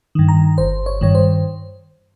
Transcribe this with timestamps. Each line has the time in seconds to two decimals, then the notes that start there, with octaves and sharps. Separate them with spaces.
0.15 G2 D#3
0.29 A#5
0.58 G1 C5
0.86 C#5
1.01 G2 D#3 C#5
1.15 C5